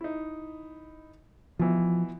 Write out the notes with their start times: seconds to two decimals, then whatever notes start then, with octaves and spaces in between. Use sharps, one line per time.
0.01 D#4 E4
1.59 B2 E3 F3